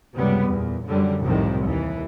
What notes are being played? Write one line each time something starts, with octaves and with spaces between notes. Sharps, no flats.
F#1 C#2 C3 G3 B3
E2 A#2
F#2 D3 G3
C2 F2 A2 C3 D#3 F3
D#2 E3